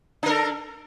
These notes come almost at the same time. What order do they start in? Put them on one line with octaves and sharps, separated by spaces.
D4 A#4 A4